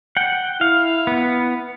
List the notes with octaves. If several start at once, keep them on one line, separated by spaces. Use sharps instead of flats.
F#5 G5
E4 F5
B3